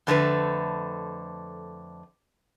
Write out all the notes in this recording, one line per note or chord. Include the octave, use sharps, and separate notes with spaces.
F2 D3 A3 B4